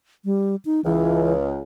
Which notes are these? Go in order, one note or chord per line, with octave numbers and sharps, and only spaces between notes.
G3
D#4
C#2 E3